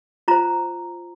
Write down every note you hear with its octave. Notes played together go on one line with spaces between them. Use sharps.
F4 C5 A#5